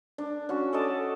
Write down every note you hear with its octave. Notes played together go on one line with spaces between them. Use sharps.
D4
C#4 F#4
A4 D5 D#5 A5